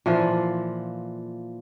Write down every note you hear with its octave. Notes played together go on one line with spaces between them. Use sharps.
A#2 E3 F3